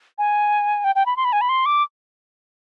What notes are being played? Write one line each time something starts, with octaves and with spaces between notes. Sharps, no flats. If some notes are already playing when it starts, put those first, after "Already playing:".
G#5
G5
G5
B5
C6
B5
G#5
B5
C6
D6